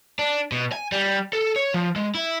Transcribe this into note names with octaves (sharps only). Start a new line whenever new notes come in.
D4
B2
G#5
G3
A4
C#5
F3
G#3
E4